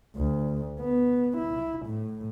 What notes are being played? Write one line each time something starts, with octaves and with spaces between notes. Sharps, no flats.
D2
B3
E4
A2